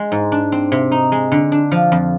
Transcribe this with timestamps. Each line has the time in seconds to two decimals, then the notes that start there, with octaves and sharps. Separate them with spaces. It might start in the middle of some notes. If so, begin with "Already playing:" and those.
Already playing: G#3
0.12 G#2
0.32 D4
0.52 C4
0.72 C3
0.92 D#4
1.12 G#3
1.32 D3
1.52 D4
1.72 F3
1.92 F2